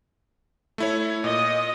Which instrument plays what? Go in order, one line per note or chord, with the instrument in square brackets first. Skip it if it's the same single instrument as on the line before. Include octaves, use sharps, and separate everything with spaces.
[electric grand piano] A3 E4 C#5
[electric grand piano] A#2 [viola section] D#5